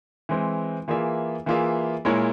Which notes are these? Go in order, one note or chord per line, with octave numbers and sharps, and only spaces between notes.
E3 G#3 C4
E3 A#3 F4 G#4 E5
E3 A#3 F4 G#4 E5
A#2 G#3 E4 A#4 C#5